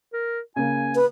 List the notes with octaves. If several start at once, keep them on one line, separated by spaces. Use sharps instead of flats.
A#4
C#3 A#3 G#5
B4